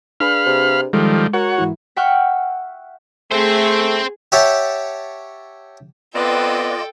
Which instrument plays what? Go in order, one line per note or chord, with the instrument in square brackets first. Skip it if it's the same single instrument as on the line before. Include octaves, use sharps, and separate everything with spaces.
[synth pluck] D4 G#4 B4 [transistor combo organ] F5 B5 F6
[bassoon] C3
[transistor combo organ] D#3 F3 G3 [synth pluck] G#3 [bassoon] A4
[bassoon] F#4 [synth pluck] A#4 [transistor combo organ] C#5 F#5
[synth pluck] G#2 E3 E4
[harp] E5 F#5 G5 C#6 F6 F#6
[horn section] A3 [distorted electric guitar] C4 C5 [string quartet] G#4
[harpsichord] G4 C#5 E5 F#5 G5 A5
[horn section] B3 C4 [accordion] F4 D5 D#5 [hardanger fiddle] A4 G5 [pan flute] B4